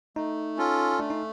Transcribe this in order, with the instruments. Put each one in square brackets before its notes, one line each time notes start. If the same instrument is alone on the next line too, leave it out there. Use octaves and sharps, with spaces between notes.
[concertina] A3 [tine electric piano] D#4
[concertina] C#4 F4 A4
[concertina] A3 [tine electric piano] D4
[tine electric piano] D#4